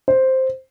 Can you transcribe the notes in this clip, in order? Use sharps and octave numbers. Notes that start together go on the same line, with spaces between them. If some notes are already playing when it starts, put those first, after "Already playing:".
C5